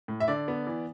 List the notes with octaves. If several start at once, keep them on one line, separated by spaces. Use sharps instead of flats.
A2
E5
D3 D5
B3
E3